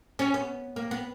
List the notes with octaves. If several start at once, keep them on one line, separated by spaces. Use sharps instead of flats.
C#4
B3
A#3
B3